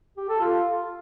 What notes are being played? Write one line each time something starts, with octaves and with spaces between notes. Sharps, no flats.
G4
A4
F4